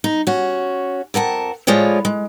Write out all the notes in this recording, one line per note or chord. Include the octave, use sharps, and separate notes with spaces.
D#4
C#4 F#4
F2 A#4 F#5 A5
A2 F3 G#3 F4 C#5 D5
G#3